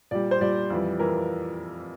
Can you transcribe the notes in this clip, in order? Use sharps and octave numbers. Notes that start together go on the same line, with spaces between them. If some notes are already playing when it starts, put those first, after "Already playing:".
A#2 G3 D5
C5
A#2 G3 D5
F2 E3 G3
E3 G3 A#4